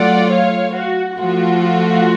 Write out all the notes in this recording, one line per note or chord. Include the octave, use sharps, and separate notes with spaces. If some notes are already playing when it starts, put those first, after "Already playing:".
Already playing: F#3 A3 F4 D5 F#5
C#5 F5
F#4
F3 A3 F4 F#4